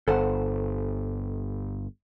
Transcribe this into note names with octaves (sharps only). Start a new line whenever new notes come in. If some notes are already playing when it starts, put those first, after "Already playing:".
G1 A4 C5 F#5